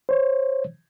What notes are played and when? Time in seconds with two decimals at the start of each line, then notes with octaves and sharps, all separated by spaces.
0.09 C5 C#5